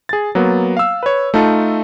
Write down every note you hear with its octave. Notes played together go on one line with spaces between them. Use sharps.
G#4 A6
F#3 A#3 B3
F5 E6
B4 C#5
A3 D#4 F4 A4